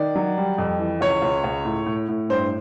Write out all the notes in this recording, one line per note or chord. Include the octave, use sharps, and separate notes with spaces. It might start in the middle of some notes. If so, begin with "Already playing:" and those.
Already playing: D#3 D5
F#3
G3
F2
E3
C#2 C#5
C#2
C#2
A2
A2
A2
G2 C5